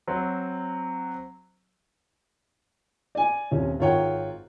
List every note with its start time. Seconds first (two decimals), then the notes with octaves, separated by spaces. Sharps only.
0.07 F#3 C4
3.15 D5 G#5
3.51 D#1 C3 C#4
3.79 G#1 F4 A#4 C#5 F#5 G5